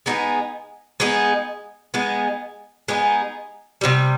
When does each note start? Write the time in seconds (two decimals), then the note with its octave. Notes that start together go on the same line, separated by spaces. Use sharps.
0.06 G#3 B3 D#4 G#4
1.00 G#3 B3 D#4 G#4
1.94 G#3 B3 D#4 G#4
2.88 G#3 B3 D#4 G#4
3.81 C3 E3 G3